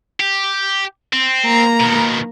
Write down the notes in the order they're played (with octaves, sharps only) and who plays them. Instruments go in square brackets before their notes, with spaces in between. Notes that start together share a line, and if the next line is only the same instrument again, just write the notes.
[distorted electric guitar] G4
C4
[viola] A#3 A#5
[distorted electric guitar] B2 D#3